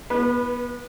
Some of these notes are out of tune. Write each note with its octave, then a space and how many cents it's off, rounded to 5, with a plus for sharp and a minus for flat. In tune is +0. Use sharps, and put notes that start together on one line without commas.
B3 -30 B4 +0